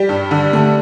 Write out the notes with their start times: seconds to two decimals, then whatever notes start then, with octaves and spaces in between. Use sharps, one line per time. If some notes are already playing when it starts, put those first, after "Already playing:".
Already playing: G3 G4
0.09 G2
0.31 D3
0.53 A3